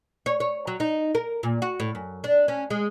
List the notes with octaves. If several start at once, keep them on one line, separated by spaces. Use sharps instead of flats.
C#5
C#5
F#3
D#4
A#4
A#2
F#4
A2
F#2
D4
C#4
G#3